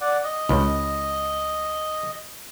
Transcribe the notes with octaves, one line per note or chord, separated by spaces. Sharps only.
D5 F#5
D#5
C#2